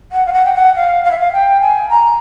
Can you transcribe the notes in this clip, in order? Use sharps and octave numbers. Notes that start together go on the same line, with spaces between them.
F#5
F5
F#5
G5
F#5
F5
F5
E5
F5
G5
G#5
A#5